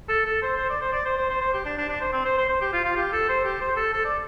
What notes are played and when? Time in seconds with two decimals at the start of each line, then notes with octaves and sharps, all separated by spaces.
0.09 A4
0.25 A4
0.42 C5
0.57 C5
0.70 D5
0.81 C5
0.93 D5
1.05 C5
1.17 C5
1.30 C5
1.41 C5
1.54 G4
1.66 D4
1.78 D4
1.89 D4
2.01 C5
2.13 C4
2.25 C5
2.38 C5
2.49 C5
2.61 G4
2.73 F4
2.84 F4
2.97 G4
3.13 A4
3.29 C5
3.44 G4
3.61 C5
3.76 A4
3.93 A4
4.05 D5